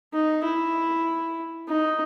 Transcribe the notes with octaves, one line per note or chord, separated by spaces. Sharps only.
D#4
E4
D#4